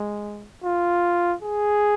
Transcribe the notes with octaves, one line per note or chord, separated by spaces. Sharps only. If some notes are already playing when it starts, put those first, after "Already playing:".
Already playing: G#3
F4
G#4